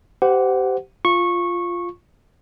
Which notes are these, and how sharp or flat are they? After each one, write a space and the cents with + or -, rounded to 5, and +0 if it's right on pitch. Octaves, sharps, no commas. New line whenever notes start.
G4 -20 C5 -25 F#5 +0
F4 +0 C#6 -15